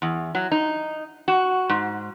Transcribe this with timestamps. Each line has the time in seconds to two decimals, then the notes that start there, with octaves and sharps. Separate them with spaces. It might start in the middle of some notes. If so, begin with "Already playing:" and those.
0.02 E2
0.35 F#3
0.52 D#4
1.28 F#4
1.69 G#2